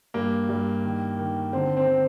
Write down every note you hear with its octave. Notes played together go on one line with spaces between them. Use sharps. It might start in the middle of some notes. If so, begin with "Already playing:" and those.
G2 A#3
G2
D#3
D#3
D3 C4
C4
D3